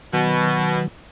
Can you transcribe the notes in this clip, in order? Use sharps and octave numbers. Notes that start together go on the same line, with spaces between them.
B2 D#3 F#3